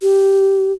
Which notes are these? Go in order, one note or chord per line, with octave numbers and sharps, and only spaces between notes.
G4